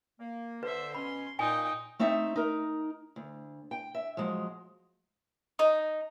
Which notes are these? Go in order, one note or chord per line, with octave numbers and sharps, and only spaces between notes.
A#3
D3 B4 C5 E5
B2 C#4 B5 C6
A#2 D#4 G5 G#5
A3 C4 D#4 E5
D#4 A#4
D2
G5
E5
F3 F#3 G#3
D#4